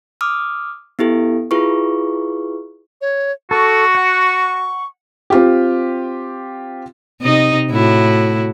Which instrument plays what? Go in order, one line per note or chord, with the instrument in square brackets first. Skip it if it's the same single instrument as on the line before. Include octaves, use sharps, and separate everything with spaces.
[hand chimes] D6 D#6 F6
B3 E4 G4 A4
E4 F4 G#4 B4 C#6
[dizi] C#5
[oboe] F#4 [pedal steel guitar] A4 [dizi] C#6
[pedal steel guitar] F#5
[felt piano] C4 F4 G4
[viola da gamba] C3 D#4 D#5
A2 E4 F#4